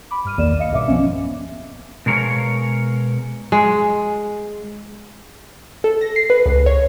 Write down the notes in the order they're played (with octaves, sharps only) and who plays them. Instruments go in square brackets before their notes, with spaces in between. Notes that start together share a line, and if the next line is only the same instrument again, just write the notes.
[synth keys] B5 D6
G2 F6 D#7
A#1 E2 D#3 A#3 D5 E7
D#5 F5 C#7
B1 G2 B2 E5 D6
F3 B3 C#4
[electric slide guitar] B2 G#3 A#4 C#5 F5
[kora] G#3
[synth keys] A4
A#6
C7
B4
C#2
C#5